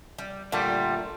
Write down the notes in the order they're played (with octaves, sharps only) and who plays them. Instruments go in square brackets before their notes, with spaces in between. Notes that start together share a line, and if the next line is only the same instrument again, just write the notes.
[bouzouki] G3
[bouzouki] A#2 A3 F4 [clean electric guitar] D3 G3